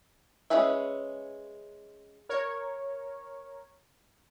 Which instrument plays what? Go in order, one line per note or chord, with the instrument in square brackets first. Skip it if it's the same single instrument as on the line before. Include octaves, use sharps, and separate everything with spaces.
[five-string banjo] G#3 C#4 G#4 B4 E5
[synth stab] A#4 C#5